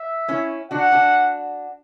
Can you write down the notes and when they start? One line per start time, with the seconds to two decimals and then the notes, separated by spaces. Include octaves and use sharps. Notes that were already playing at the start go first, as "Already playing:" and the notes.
Already playing: E5
0.28 C#4 E4
0.71 D4 F#4 F#5
0.92 D4 F#4